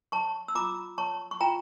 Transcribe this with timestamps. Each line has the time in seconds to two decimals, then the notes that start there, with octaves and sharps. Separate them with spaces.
0.12 C#5 A5 C#6
0.48 E6
0.55 F4 A#5 D6
0.98 C#5 A5 C#6
1.31 C#6
1.41 F4 G5 A#5